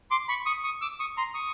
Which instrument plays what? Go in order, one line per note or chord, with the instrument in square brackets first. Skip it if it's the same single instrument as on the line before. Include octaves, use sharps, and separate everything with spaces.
[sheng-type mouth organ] C6 D6
B5 C#6
C#6 D#6
C#6 D#6
D6 E6
C#6 D#6
A#5 C6
C#6 D#6